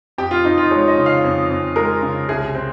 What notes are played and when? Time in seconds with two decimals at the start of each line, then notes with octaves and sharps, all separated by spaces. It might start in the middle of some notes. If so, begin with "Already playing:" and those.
0.18 F2 G4
0.31 F4
0.45 F2 D#4
0.58 F4
0.71 G#3 C#5
0.88 D#5
0.98 C#3
1.06 F5
1.24 F2
1.50 F2
1.76 G#3 A#4
2.02 C#3
2.29 C2 G#4
2.55 C4